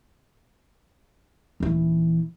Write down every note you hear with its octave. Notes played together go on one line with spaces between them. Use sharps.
D#1 E3